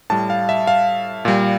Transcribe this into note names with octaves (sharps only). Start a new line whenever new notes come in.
A2 G3 A5
F5
E5
F5
A#2 G3